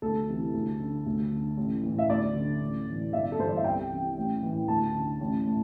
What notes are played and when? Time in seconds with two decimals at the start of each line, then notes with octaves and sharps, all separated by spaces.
0.02 D2 A4
0.28 C3 E3
0.54 D2
0.80 D3
1.06 D2
1.32 D3
1.57 A1
1.83 A2 E3
1.98 E5
2.10 D2 D5
2.35 D3
2.60 A1
2.87 A2 E3
3.13 G1 E5
3.32 A4
3.39 G2 E3 C5
3.48 D5
3.57 E5
3.64 C2 G5
3.90 C3 E3
4.17 A1
4.43 A2 E3
4.68 D2 A5
4.95 D3
5.20 A1
5.46 A2